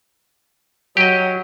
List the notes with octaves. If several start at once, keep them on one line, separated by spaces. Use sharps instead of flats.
F#3 G4 D#5